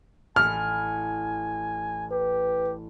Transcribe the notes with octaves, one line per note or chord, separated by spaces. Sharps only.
A1 E4 G#5 F6
G4 B4